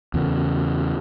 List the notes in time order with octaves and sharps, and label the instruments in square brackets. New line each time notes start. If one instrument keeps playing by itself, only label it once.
[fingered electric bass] E2 C#3